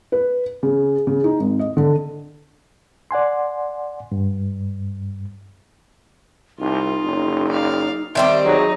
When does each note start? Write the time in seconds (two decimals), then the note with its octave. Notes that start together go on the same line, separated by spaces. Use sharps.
0.12 B4
0.63 C#3
1.07 C#3
1.24 D#4
1.40 G#1
1.59 D#5
1.77 D3
3.11 D5 F#5 G#5 C6
4.12 G2
6.60 C2 D#4 F4
7.04 F#1
7.48 D5 F5
8.15 D#3 G3 C4 E5 C6 D6
8.45 F#3 D#4 G#4